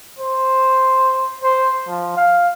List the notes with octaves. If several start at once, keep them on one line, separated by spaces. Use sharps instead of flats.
C5
C5
F3
F5